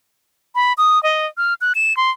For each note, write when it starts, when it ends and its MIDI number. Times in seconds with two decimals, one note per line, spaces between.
0.55 0.73 83
0.78 1.01 87
1.03 1.26 75
1.37 1.54 89
1.61 1.73 90
1.75 1.96 100
1.97 2.10 84